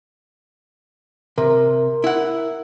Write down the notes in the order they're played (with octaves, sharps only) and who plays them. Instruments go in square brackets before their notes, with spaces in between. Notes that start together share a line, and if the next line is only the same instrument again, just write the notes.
[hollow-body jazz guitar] C3 [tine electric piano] A#4
[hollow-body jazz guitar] E4 F#5